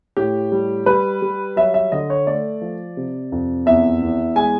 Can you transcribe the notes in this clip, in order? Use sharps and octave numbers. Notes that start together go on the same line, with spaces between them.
A2 G4
G3
G3 B4
G3
F#3 E5
E5
D3 D#5
C#5
A3 D5
F3
C3
F2
E2 E5
E2
G#3 G#5